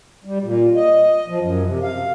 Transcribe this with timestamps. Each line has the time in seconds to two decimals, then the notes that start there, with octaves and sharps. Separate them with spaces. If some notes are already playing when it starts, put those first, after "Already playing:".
0.25 G3
0.42 A#2
0.75 D#5
1.28 F3
1.41 F#2
1.64 C3
1.83 F5